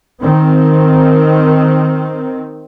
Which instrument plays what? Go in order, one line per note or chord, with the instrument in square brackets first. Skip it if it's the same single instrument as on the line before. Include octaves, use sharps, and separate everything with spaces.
[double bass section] D#3 C4